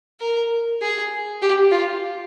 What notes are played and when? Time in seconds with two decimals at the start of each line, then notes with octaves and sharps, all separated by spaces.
0.20 A#4
0.82 G#4
1.42 G4
1.71 F4